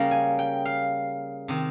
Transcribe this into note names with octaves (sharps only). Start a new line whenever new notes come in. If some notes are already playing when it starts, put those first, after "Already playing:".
Already playing: C#3 G3 A#3 A#5
G#5
G5
F5
C3 D#3